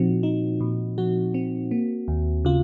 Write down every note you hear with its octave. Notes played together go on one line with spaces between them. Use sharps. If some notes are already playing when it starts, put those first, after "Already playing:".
Already playing: A#2 F3 C4 D#4 F#4
D#4
A#2
F3 F#4
C4
A#3
D#2
C#3 F4